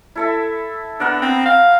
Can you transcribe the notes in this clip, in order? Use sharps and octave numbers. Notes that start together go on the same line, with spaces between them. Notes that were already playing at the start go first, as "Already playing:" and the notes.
E4 A4 E5
B3 D4 A#4 F#5
C4 A#5
F5